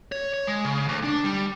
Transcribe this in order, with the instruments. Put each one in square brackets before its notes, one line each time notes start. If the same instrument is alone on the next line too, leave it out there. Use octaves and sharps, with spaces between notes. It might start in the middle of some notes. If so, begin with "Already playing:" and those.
[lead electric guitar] C#5
C#5
G#3
C#3
D2
D4
G3